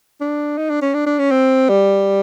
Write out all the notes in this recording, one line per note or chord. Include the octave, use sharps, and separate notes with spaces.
D4
D#4
D4
C#4
D4
D4
C#4
C4
G3